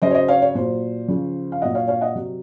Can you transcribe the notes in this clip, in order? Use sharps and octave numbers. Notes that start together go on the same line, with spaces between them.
C#3 F#3 C5 D#5
C#5
C5 D#5
C#5 F5
C#5
A#2 F#3 C5
C#3 F3
F5
A#2 F#3 D#5 F#5
C#5 F5
C#5 F5
D#5 F#5
C3 F#3